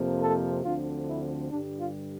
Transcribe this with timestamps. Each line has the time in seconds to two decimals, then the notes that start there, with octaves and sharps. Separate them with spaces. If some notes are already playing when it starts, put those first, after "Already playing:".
Already playing: F2 C3 F3 A#3
0.22 A4
0.65 D2 D3 F3 C4 F4
1.08 E4
1.51 G2 D3 G3 D4
1.80 F4